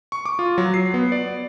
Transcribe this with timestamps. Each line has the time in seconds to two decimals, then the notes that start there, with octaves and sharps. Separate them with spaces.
0.12 C#6
0.26 D6
0.39 F4
0.58 F#3
0.74 C7
0.94 B3
1.12 D5